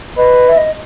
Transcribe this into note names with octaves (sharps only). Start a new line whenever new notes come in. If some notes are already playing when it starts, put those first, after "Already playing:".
B4 D#5
E5
D#5